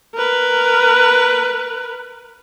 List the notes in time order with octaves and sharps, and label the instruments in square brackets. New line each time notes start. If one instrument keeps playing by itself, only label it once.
[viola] A#4 B4